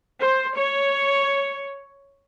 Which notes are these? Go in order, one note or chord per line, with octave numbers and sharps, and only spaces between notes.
C5
C#5